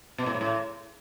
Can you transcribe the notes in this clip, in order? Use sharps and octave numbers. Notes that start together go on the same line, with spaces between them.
B2
A2
G#2
A2